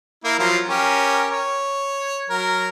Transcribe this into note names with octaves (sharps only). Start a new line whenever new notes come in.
A#3 E4 A#4
F3 F#3 F5
C#4 G4 A#4
C#5
F#3 A#4